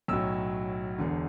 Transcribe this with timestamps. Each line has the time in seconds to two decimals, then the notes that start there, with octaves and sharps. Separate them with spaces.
0.08 B1 A2 F#3 E6
0.98 E1 E2 D3